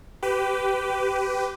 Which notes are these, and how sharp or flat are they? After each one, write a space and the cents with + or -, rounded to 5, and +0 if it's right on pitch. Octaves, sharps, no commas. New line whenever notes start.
G4 -15 B4 +20